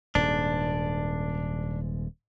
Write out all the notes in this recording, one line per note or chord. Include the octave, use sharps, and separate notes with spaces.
D#1 G#2 D4